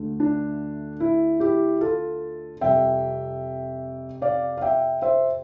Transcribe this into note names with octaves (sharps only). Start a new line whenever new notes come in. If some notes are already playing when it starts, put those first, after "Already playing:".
Already playing: D2 D3 A3
D4
E4
E4 G4
F4 A4
F2 C3 G3 E5 G5
D5 F5
F5
E5 G5
C5 E5